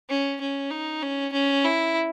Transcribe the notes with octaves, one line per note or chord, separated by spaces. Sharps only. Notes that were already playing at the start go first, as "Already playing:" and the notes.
C#4
C#4
D#4
C#4
C#4
E4